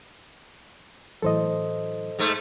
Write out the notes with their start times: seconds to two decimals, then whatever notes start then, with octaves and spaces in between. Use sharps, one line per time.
1.22 A2 E3 F#3 A4 C5 D#5
2.19 G#2 A3